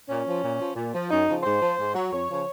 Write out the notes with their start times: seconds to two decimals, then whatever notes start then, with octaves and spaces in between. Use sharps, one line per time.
0.08 A#2 C#4
0.26 F3
0.42 A#2
0.59 F3
0.76 A#2
0.93 F3
1.10 F#2 D#4
1.26 C#3 F3
1.43 G#2 C5
1.60 F3
1.78 G#2
1.95 F#3
2.12 F2 C#5
2.29 C#3 F3